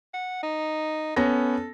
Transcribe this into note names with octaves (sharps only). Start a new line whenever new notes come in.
F#5
D#4
B3 C#4 A4 A#6